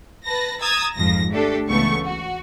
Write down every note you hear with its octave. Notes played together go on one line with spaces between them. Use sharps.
B4 A5 A#6
A#5 D#6 E6 G#6 A6
G#1 F2 G#2 F3 A#6
A3 D4 G4 A4
C#2 C#3 E3 A3 B3 C#6
F#4